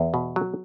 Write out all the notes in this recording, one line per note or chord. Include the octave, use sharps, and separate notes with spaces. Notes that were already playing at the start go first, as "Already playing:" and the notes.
Already playing: E2
B2
F#3